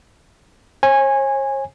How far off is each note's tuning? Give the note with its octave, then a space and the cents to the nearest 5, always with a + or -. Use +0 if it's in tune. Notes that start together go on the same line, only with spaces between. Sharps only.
C#5 -45 G#5 -15